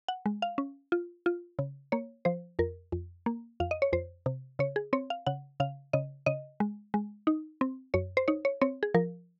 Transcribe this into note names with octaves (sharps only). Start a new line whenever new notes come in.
F#5
G#3
F5
C#4
F4
F4
C#3
A#3 C#5
F3 C5
F2 A#4
F2
A#3
F2 F5
D#5
C#5
F2 C5
C3
C#3 C#5
G#4
C4 C#5
F5
C#3 F#5
C#3 F5
C#3 D#5
C#3 D#5
G#3
G#3
D#4
C4
F#2 C#5
C5
D#4 C#5
C#5
C4 C#5
G#4
F3 A#4